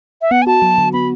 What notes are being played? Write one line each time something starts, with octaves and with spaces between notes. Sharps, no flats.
E5
B3 F#5
G#5
F#4 A5
F#3
D3
B3 B5